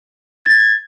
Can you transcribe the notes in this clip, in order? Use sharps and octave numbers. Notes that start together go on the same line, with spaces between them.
G#6 A6